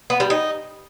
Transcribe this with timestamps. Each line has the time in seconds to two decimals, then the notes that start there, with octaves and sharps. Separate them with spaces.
0.10 B3
0.20 G3
0.30 D#4